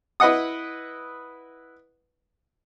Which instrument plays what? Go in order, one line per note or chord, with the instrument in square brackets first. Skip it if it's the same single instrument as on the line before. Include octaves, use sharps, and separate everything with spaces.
[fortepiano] E4 B4 D#5 F#5 D#6